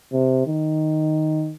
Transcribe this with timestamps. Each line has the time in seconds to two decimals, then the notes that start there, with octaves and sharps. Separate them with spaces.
0.12 C3
0.47 D#3